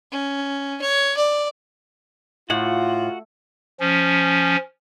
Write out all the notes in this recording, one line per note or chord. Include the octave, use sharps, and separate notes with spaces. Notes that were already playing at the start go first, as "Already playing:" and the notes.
C#4
C#5
D5
A2 F4 F#4 F#5
F3 C#4